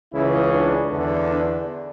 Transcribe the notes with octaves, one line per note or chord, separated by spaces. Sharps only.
C#2 C#3 E3 E4
D4
E2 D3
D4